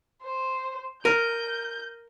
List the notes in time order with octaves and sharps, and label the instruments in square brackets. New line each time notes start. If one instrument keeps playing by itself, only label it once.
[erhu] C5
[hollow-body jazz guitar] A#4 [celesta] F6 A#6 D#7 [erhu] G6